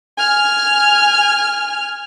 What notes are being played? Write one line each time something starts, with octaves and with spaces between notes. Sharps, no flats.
G#5 F6